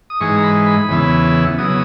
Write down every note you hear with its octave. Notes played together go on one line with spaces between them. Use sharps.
D#6
G#2 E3 G#3 D#4 C#6
A#5
B5
B5
E2 C#3 E3 B3 E4
C#3 F#3 B3 E4 D#6